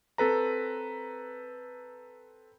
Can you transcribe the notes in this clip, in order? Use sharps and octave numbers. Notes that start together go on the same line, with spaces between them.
C4 A4 B4 A#5